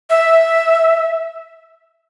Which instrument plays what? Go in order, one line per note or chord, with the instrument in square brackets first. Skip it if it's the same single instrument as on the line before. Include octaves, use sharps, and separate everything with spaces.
[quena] E5